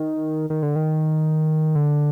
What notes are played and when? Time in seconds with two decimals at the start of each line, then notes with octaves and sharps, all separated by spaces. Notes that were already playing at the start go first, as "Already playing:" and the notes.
Already playing: D#3
0.50 D#3
0.62 D3
0.76 D#3
1.75 D3